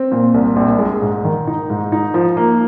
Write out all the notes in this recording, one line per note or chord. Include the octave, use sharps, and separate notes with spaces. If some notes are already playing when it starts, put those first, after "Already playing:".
Already playing: C4
A#2
C2
A#1
G#3
G#2
D#3
D#4
G#2
D#4
F3
A#3